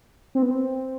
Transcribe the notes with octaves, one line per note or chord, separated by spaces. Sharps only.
C4
B3
C4